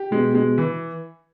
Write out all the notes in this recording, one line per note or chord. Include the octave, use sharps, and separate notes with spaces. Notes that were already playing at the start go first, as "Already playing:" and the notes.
Already playing: G4
B2 G#3
G#3
E3